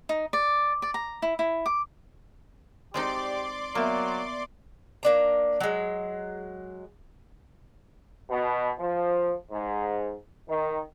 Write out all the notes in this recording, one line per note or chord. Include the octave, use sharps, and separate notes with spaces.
D#4
D5
D5
A#5
E4
E4
D6
G#3 C4 D#4 G4 D5 C6 D6
F#3 A#3 B3 E5
A#3 D4 A#5
F#3 G#3
B2
F3
G#2
D#3